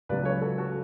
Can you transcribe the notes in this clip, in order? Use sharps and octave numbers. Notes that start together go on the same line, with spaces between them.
C#2 C#3 F#3 B4 D5
A4 C#5
F#4 A4
F#4 A4